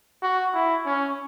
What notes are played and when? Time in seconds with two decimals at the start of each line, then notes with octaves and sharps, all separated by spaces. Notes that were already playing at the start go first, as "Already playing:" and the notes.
0.22 F#4
0.54 E4
0.85 C#4